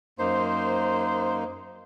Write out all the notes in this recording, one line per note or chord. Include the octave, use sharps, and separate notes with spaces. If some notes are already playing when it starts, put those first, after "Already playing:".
F#2 A#3 D#4 C5